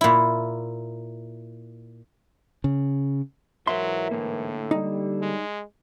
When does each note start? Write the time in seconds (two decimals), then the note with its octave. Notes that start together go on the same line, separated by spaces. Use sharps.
0.01 A#2 E4
2.64 C#3
3.67 G#2 E3 F#3 A#4 C5 E5 C6
4.11 A2 D3 A#3
4.71 G3 D#4
5.22 G#3